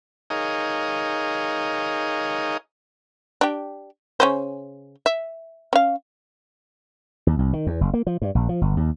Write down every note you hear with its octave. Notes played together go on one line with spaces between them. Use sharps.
D#4 G#4 A#4 C#5 D#5 F5
D4 G4
C#3 C#4 C5
E5
C#4 F5
D#2
C2
D#3
E2
F#1
A#3
F3
G2
A#1
F3
G1
D#2